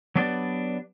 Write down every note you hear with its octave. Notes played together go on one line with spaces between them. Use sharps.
F#3 B3 D4 G4 B4 D5